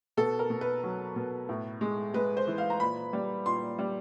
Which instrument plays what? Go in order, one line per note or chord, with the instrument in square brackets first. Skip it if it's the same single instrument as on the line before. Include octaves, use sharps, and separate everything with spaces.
[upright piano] B2 A4
A#4
B2
B4
F#3
B2
A2
G#3
G#3 B4
C5
E3
F5
A#5
A#2 B5
G3
A#2 C6
G3